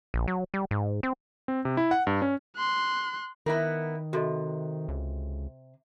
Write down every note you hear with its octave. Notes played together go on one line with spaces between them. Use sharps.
A#1
F#3
G3
G#2
C4
C4
C3
E4
F#5
G2
C#4
C6 F#6
D#3 B3 E4 A#4
C3 F#4 A4 D#5
C#2